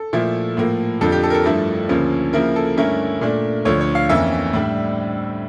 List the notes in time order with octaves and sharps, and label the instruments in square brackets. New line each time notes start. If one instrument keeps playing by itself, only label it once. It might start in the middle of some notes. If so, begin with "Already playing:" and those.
Already playing: [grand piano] A4
A#2 F3 A3 E4
A2 F3 A#3
F2 D3 F3 A4
G4
A4
A#4
A4
G2 F3 A3 E4 A4
D2 C#3 F3 A#3 C#4
C#3 F3 A#3 E4 A#4
A4
G2 D3 A3 C#4 E4 A#4
A#2 A3 D4
D2 D3 F3 C#5
C#5
F5
F2 E3 A#3 C#4 E5
A2 G3 D4